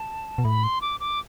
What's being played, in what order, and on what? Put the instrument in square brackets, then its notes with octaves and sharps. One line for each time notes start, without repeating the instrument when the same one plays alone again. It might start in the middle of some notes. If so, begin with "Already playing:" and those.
Already playing: [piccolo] A5
[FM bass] B2
[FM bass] A2 [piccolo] B5
[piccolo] C6
D6
D6